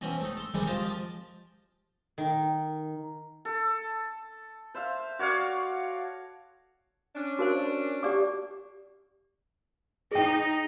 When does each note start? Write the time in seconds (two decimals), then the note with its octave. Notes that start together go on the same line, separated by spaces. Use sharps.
0.01 B2 E3 C4 C#4
0.21 A3 D#4
0.37 A4 C6
0.54 C3 D#3 E3 G3 G#3
0.67 F4 G4 C5 D#5 F5 A5
0.82 F3 A5
2.18 D#3
3.45 A4
4.75 C5 E5 F5
5.19 F#4 C#5 D5 F5
7.15 C#4 D4
7.39 F#4 A#4 C5
8.03 G4 D5 D6
10.11 D#4 G#4 D#5 G5